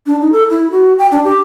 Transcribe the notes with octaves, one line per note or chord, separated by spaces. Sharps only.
D4
D#4
A4
E4
F#4
G5
D4
G4